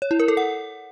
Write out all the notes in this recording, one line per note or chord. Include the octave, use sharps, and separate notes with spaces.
C#5
E4
A#4
A4
F#5